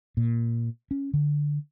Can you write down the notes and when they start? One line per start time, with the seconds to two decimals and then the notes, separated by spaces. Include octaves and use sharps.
0.17 A#2
0.91 C#4
1.14 D3